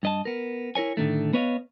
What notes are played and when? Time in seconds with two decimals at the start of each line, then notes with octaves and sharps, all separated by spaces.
0.03 G2 D#5 A5
0.25 B3 A#4
0.75 E4 A#4 C#5 G#5
0.97 A2 D3 D#3 A3
1.33 B3 B4 C#5 D#5 F5